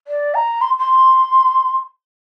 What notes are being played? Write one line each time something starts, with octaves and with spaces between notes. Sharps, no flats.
D5
A#5
C6
C6